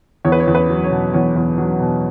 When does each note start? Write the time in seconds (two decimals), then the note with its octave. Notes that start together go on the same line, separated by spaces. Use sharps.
0.25 E2 C#5
0.32 B4
0.40 C#5
0.47 E2
0.55 B4
0.69 F#3
0.84 C#5
0.91 B2
1.13 E2 C#5
1.36 E2
1.58 F#3
1.80 B2